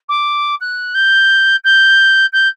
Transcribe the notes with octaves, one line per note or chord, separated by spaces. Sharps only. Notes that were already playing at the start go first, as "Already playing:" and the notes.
D6
F#6
G6
G6
G6